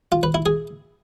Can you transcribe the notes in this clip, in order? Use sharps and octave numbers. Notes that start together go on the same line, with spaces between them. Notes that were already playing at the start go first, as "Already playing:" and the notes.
F4
B4
E4
G#4